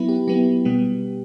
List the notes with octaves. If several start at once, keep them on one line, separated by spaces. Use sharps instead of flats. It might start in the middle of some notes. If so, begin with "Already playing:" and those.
Already playing: F#3 B3 E4 B4
G4
F#3 B3 E4 G4
B2 G3 B3